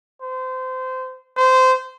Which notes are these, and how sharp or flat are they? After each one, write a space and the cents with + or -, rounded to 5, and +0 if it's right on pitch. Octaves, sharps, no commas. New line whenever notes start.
C5 -25
C5 -20